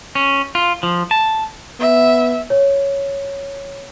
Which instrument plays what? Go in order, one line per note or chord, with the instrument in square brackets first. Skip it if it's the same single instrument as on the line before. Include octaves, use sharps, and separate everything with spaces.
[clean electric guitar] C#4
F4
F3
A5
[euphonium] B3 [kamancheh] E5
[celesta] C#5